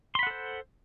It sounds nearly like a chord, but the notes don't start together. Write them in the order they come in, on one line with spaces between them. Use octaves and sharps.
C6 B5 F#5 A4 C5